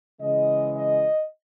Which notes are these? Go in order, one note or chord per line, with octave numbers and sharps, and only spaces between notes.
C#3 E3 G#3 D#5
D#5